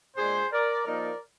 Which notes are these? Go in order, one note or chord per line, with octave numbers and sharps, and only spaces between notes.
A#2 G#3 D4 G#4 C5
A#4 D5
F3 A#3 D#4 A#4 D5